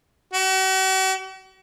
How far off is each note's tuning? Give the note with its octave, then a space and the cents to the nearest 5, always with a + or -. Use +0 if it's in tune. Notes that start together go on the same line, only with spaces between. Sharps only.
F#4 +45